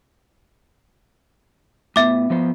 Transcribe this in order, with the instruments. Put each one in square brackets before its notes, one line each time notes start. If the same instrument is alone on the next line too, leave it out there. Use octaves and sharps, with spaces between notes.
[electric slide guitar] A2 B3 [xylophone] E5 D6
[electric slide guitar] F3 B3 C5